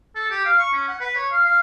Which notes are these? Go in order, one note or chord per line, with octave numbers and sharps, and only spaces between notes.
A4
G4
F5
C#6
C#4
F#5
B4
C#5
F5
F5